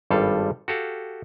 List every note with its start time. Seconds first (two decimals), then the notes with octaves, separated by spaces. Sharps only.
0.10 G#1 G2 G3 A4 F5
0.68 F#4 G4 A4 F5